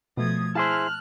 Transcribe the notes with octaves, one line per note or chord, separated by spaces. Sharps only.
B2 F3 A3 D#6 G#6
E4 G#4 C5 A5 F6 F#6